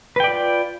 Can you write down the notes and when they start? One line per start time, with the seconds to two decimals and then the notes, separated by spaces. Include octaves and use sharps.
0.16 B4
0.20 G5
0.24 D5
0.28 F4